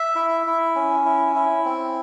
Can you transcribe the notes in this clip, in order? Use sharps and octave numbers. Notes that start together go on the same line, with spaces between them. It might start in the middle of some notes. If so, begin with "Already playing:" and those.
Already playing: E5
E4
E4
C#4
E4
E4
C4